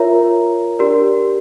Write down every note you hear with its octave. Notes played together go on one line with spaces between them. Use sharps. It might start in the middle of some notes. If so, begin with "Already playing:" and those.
Already playing: F4 A#4 C#5 E5 A#5
D4 G4 A#4 D5